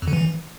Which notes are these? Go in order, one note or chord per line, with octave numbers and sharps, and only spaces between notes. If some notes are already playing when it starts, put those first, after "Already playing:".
F2
D3
E3